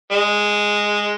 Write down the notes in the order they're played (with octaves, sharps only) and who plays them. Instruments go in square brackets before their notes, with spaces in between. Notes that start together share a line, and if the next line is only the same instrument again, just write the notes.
[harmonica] G#3